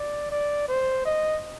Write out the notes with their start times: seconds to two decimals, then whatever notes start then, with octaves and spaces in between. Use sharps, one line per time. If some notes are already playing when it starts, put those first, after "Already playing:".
Already playing: D5
0.31 D5
0.68 C5
1.05 D#5